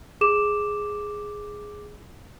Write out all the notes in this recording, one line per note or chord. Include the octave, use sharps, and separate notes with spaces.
G#4 D6 E7